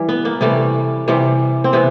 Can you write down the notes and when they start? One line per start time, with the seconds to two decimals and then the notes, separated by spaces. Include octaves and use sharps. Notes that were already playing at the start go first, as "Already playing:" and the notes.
Already playing: E3 G3
0.09 B3
0.25 A#3
0.41 C3 E3 G3 A3
1.08 C3 E3 G3
1.64 C4
1.73 C3 E3 B3